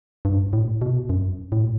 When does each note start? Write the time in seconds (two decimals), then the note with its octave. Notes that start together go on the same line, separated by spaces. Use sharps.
0.25 G2
0.53 A2
0.82 B2
1.10 F#2
1.52 A2